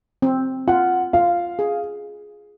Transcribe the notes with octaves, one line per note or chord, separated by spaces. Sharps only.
C4
F4 F#5
F4 F5
G#4